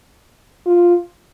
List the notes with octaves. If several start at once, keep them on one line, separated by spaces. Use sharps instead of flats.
F4